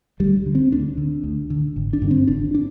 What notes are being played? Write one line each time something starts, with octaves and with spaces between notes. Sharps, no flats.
D2 G3
D3
C4
D2 D4
D3
D2
D3
G#1
D4
G2 D3
C4
G#1 D4
D4